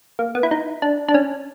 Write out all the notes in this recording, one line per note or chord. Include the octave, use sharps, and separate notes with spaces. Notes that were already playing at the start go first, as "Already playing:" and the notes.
A#3
B3
E4
D#4
D4
D4
C#4